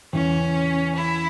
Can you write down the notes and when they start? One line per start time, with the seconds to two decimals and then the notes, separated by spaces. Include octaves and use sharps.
0.13 E2 C#3 E3 C#4
0.95 E4